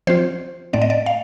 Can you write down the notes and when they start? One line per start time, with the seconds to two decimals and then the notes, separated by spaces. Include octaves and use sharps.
0.07 F3 C4 F4 C5
0.73 A2 A3 C4 D5
0.82 D#5
0.90 D5
1.06 F5